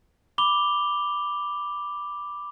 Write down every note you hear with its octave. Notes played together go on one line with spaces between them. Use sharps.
B5 D6 F7 G7